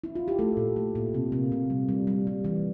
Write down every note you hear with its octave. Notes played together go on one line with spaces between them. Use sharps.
E4
F4
G4
A3 A4
A#2
A3
A#2
C3
A#3
C3
G3
G3
G3
G3
E3